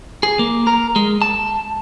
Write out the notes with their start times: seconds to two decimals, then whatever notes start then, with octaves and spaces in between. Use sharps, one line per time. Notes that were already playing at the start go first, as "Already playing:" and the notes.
0.23 G#4
0.39 A#3
0.67 A#4
0.96 G#3
1.22 A5